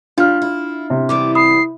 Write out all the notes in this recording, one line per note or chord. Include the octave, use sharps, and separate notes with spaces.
G3 D4 F4 F6
E4
C3
E3 G3 B3 D6
B5 D#6 C7